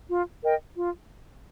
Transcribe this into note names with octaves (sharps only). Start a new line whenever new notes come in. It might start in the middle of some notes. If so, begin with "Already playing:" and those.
F4
A#4 D#5 G5
F4